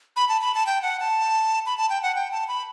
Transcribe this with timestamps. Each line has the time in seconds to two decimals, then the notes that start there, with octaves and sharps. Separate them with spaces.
0.16 B5
0.29 A5
0.41 B5
0.55 A5
0.66 G5
0.82 F#5
1.00 A5
1.66 B5
1.77 A5
1.90 G5
2.03 F#5
2.16 G5
2.32 A5
2.48 B5